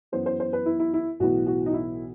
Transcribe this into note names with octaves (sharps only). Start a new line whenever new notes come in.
F#2 E3 B3 C5
C5
C5
B4
E4
E4
E4
B1 A2 E3 B3 F#4
F#4
D#4
E4